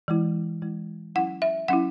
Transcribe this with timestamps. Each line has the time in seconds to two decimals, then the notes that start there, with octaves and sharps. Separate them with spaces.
0.08 E3 G#3 E4
0.62 E3 G#3 E4
1.15 F#3 C#4 E4 F#5
1.42 E5
1.68 F#3 C#4 E4 F#5